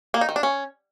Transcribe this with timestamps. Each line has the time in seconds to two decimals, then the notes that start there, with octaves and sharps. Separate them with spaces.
0.14 A#3
0.21 D#4
0.29 D#3
0.36 D4
0.43 C#4